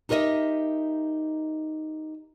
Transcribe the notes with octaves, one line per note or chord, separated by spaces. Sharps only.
D#4 G4 A#4 C5 D#5 E5